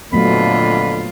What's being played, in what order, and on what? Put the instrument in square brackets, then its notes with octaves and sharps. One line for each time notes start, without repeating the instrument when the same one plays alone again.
[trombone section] F2 D3 [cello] A#2 F4 [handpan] F#3 A3 B3 [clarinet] B5